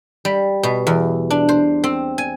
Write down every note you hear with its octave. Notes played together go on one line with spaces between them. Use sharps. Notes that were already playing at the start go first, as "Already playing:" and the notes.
G3
B2
E2
D4
C5
C4
G#5